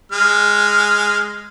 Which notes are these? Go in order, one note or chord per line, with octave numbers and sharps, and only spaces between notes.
G#3 F6